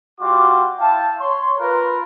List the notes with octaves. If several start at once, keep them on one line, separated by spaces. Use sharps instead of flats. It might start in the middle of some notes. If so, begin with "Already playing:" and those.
G3 F4 F#4 C6 D6
E4 F5 G5 A5
C#5 C6
F4 A#4 B4